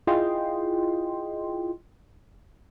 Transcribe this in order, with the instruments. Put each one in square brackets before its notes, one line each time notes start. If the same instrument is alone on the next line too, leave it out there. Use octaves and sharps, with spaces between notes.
[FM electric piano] E4 F4 G#4 D#5 G5 C6